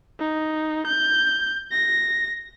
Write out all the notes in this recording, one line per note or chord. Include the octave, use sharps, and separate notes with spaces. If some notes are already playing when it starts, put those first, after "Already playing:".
D#4
G6
A#6